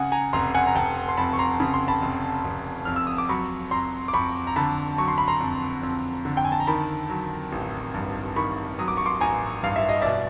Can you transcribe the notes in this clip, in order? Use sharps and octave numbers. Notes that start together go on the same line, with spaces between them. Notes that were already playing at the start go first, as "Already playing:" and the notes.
Already playing: C#3 F#5 G#5
G#5 A#5
F1 A#5 C6
F#5 G#5
A#5
F1 G5 A5
C6
F2 A5 B5
C#6
A#5 C6
C#3 B5
C6
A5 B5
F1
F1
F2 F6
E6
D#6
D6
F#3 B5 C#6
F2 A#5 C6
D6
F2 B5 C#6
A#5
D3 A5 B5
F#3 C#6
C6
B5
A#5 C6
F2
F2
D3
G5
G#5
A5
A#5
D#3 A5 B5
F#3
A1
G2
D#3 B5 C#6
F#3 D#6
D6
C#6
C6 D6
A1 G#5 A#5
G2 F5
E5
D#5
B2 D5 E5